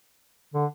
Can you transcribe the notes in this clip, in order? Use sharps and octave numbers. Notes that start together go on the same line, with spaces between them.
D3